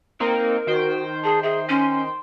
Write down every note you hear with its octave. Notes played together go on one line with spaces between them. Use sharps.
A#3 C4 D#4 A#4
D#3 F#4 C5 G5
G#4 A5
G#4 E5
C#4 C6